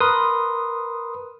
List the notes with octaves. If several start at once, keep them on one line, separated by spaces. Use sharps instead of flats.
A#4 B4 C6 D#6